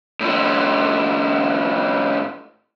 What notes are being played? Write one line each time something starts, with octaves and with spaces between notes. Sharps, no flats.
A2 F3